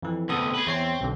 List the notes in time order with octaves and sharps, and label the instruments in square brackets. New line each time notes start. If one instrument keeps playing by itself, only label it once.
[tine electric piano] F2 E3
[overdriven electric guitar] D2 C3 [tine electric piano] B3 A4 D#6
[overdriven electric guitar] G#4 B4
[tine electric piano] E2 C#5 C7 [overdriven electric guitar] C4
[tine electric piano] B1 D3